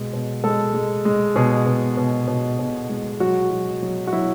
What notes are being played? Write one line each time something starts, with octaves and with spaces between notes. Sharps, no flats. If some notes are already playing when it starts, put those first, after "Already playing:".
Already playing: B2 G#3
B2
G#3 A4
G#3
G#3
B2 G#4
B2
B2
B2
B2
G#3
F#3 F#4
F#3
F#3
F#4
F#3 E4